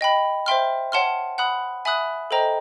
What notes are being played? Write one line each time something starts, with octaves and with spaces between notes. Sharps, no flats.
D#5 G5 B5
C5 E5 G5 C6 F6
C#5 F#5 A5 C6 F6
F#5 B5 D#6 F#6
E5 G#5 B5 D#6 F#6
A4 C5 D#5 G5 A#5